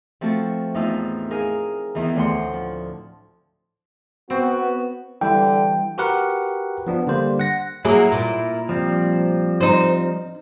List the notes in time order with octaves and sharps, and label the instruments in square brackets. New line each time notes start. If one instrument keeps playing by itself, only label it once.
[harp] F3 A3 C4 F#4 A4
E2 A2 D#4 F4 E6 G6
D#4 G#4 A#4 F5
E2 D#3 E3
D2 A2 C5 F#5 C6
F3
[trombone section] B3 [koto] C4 [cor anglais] F#4
[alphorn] D3 [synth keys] E3 G3 E4 [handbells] G5
[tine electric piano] F#4 G4 A#4 B4 F#5
F3 B3 D4
D3 G3 A#3 C5
F#5 A#6
[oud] F#3 A#3 G#4 [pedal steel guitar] E4 A#4
[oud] A#2
[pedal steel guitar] F3 G3 C4
[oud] D#4 C5